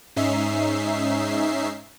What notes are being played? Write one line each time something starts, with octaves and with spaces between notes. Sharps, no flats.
G#2 C#4 D#4 E5 C7